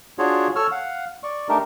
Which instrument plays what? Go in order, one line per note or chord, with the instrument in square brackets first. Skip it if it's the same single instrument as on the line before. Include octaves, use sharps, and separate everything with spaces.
[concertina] D4 F4 F#4 G#4 C#5
A4 C#5 C#6 E6 F6
F5 F#5
D5 C#6
A3 D4 D#4 G4 A#4